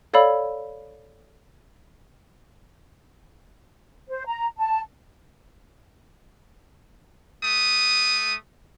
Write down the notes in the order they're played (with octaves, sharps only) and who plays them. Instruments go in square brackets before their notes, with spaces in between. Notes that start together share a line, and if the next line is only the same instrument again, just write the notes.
[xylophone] A4 C#5 D5 F5 B5 E6
[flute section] C5
A#5
A5
[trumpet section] A3 D#6